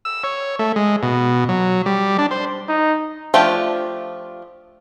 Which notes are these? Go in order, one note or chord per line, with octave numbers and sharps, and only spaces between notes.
E6
C#5
A3
G#3
B2
F#3
G3
D4
C5
D#4
F3 A3 D4 F4 G4